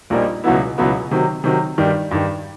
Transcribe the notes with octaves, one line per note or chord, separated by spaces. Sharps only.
A#1 A#2 G3 A#3 D#4
C#2 B2 F#3 B3 E4
C#2 B2 F#3 B3 E4
C3 D#3 F#3
C3 D#3 F#3
G2 D#3 G3
G2 D#3 G3